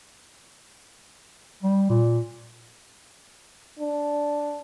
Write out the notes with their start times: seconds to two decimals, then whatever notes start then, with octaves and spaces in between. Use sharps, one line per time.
1.63 G3
1.90 A#2
3.79 D4